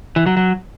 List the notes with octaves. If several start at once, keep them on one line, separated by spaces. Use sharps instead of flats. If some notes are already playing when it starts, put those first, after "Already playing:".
E3
F#3
F#3